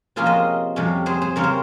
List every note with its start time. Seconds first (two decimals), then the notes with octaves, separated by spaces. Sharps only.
0.16 C3 F3 A#3 C#4 F4 G#4
0.26 C5 D#5
0.76 F2 C3 G3 C#4
1.06 G#4 C5
1.22 G#4 C5
1.36 C#3 G3 C4 A#4 C#5
1.43 C5